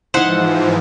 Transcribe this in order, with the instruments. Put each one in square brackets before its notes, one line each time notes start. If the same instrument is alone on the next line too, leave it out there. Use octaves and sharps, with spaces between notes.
[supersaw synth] G#2 E3 F3 [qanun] D#4 E4 [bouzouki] C5 F#5